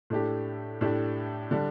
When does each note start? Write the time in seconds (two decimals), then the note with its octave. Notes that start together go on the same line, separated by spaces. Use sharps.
0.10 A2 A3 D4 G4
0.81 A2 A3 D4 G4
1.51 D3 G3 D4